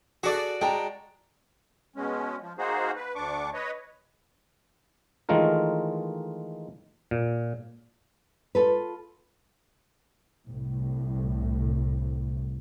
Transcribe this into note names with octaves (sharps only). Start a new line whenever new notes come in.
F#4 G#4 A4 D5
G#3 G5 A5 A#5
B2 G#3 C#4
F3
A#3 D#4 F#4 G#4 C5
B4
D2 D4 C#6 D6
B4 C#5 D#5
D#3 E3 G#3 A3 F4 A#4
A#2
F4 A4 B4
C2 A2